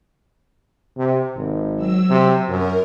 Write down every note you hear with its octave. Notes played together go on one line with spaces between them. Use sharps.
C3
G#1
F#3 E6
C3
F#2 A#4